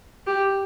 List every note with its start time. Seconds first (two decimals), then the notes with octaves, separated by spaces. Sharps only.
0.27 G4